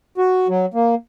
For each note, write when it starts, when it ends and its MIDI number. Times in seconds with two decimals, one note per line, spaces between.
0.18 0.47 66
0.49 0.66 54
0.74 0.95 58